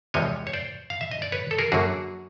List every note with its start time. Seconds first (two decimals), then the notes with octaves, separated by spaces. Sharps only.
0.14 E2 C3 F3 G#3 B3 C#5 D#5
0.47 C#5
0.53 C5 D5
0.90 F5
1.01 E5
1.11 D#5
1.22 D5
1.32 B4 C#5
1.51 A4
1.58 G#4 A#4
1.72 F#2 D3 F#3 A#3 F#4 G#4